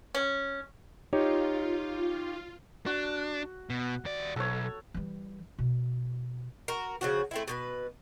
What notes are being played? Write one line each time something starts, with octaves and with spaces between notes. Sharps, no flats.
C#4
D#4 F4 G4 C#5
D4 F#4
B2
D#2 D5
B1 A4 C#5
E3 G3
B2
F#4 A#4
C#3 F3 F#4
A3 C4 E4
B2 G4 B4